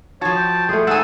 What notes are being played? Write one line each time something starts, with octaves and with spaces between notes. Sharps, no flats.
F3 F#4 C#5 A5
G5
A3 F4 G#4
G#2 A4 C5 F#5 G#5 E6